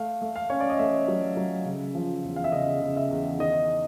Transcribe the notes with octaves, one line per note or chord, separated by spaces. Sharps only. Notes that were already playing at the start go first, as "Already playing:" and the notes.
Already playing: A3 F5
A3
F5
C#4 C#5
D5
D#5
A3 E5
F#3
F#3
C#3
F3
E2
F5
E5
C#3 D#5
C#3
E5
E2
D#3 D#5